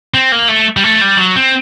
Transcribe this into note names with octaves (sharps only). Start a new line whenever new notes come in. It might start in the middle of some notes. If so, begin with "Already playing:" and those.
C4
A#3
A3
G3
A3
G3
F#3
C4